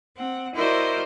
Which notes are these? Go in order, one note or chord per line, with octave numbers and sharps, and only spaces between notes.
C4 F#5
E4 F#4 A#4 C5 D5 D#5